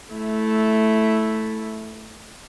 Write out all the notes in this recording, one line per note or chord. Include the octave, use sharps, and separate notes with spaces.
A3 E4